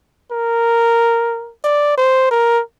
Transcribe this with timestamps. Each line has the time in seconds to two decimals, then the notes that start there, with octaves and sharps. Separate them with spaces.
0.31 A#4
1.64 D5
1.98 C5
2.31 A#4